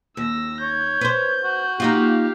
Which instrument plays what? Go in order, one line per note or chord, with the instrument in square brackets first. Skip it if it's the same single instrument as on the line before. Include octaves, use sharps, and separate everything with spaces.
[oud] D#2 [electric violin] E6 A#6
[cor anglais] C#5 [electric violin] G6
[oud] B4 C5
[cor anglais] F#4
[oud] A#3 D#4 F4 [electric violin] G4 F5